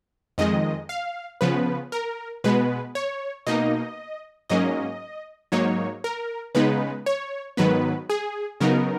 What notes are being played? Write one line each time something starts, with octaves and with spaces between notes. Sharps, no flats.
F2 D#3 G#3 D#5
F5
C#3 F3 B3 B4
A#4
B2 G#3 B3 B4
C#5
B2 A#3 D#4 D#5
G#2 F#3 A#3 C#4 D#5
G#2 F#3 A#3 D#4 C#5
A#4
C#3 G#3 B3 D#4 B4
C#5
G#2 D#3 F#3 B3 B4
G#4
C#3 F#3 B3 D#4 A#4